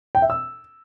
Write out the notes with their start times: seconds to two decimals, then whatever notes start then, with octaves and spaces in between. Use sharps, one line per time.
0.15 G5
0.22 E5
0.30 E6